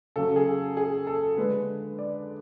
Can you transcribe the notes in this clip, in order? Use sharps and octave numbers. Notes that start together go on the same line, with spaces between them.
C#3 F#3 C#4 A4
G#4
G#4
A4
D3 G#3 D4 B4
D5